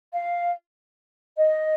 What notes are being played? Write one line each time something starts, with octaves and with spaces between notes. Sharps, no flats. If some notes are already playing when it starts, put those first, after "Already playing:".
F5
D#5